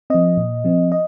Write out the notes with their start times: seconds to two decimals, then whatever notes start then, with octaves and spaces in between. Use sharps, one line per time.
0.10 F3 C4 D#5
0.37 A#2
0.64 F3 C4
0.92 D#5